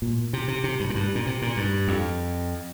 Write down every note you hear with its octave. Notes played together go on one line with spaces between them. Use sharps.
A#2
C3
C3
C3
G2
A#2
G2
A#2
C3
A#2
G2
F2